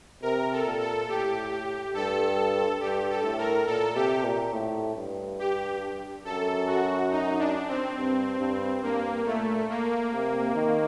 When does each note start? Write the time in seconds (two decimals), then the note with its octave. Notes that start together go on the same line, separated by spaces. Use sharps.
0.22 C3 A#4
0.52 A4
0.65 A#2
0.81 A4
1.08 A2 G4
1.94 G2 A4
2.80 G2 G4
3.10 A4
3.24 A2
3.38 A#4
3.67 A#2 A4
3.95 C3 G4
4.24 A#2
4.53 A2
4.96 G2
5.39 G4
6.24 F#2 A4
6.67 F#4
7.11 D#4
7.39 D4
7.68 C4
7.97 G2
8.39 G2
8.83 G2 A#3
9.25 A#2 A3
9.69 A#3
10.12 C3
10.55 D#3